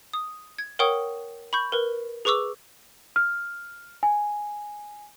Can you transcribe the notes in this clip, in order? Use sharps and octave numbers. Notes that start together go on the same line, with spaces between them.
D#6
G#6
A#4 C#5 F#5 G5 C#6 D#6
B5 C#6 G6
A#4 B4
G#4 B4 C#6 D6 E6
F6
G#5